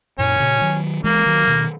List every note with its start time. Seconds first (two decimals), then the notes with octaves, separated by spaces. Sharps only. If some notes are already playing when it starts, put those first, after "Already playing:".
0.19 F#2 A#2 C#4
0.40 A#2 C#3
0.61 D#3 F#3
1.04 E3 G#3 A#3
1.26 D#3 F#3
1.47 B2 D#3